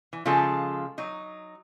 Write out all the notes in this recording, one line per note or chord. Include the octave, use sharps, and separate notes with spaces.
E3
C#3 F3 G#3 F4 A4
F#3 D#4